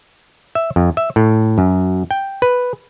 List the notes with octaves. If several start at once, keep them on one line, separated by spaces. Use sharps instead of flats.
E5
F2
E5
A2
F#2
G5
B4